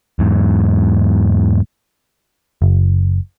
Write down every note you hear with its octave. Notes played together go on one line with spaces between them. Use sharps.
E2 G#2
F#1